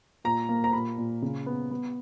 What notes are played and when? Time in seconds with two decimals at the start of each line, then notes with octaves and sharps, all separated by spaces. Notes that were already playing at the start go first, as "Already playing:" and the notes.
0.24 A#2 A#5
0.49 A#3
0.64 A#5
0.73 A#2 B5
0.98 A#2
1.22 C#3
1.46 B3
1.71 B3